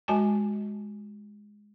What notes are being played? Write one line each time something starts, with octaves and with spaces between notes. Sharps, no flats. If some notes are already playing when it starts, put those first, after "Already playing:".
G#3 F#4 G#5 A5